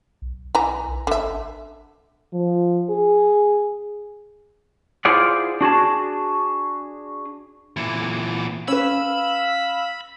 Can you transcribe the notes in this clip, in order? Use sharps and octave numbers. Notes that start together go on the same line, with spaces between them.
B1
E3 A#5
G#1 D3 E5
F3
G#4
E4 F4 G#4 C5 D5 F#5
D4 F#4 G#4 A5
A#2 E3
C#4 B4 F5 B5 E6